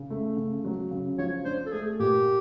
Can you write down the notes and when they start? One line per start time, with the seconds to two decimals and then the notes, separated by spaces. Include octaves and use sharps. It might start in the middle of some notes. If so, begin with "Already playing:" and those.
Already playing: C#3
0.10 A3
0.37 C#3
0.65 F#3
0.91 C#3
1.18 F3 C#5
1.45 D4 C5
1.66 A4
1.72 A3 G#4
2.00 A#2 G4